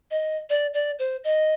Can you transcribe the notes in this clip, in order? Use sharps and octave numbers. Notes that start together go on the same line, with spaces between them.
D#5
D5
D5
C5
D#5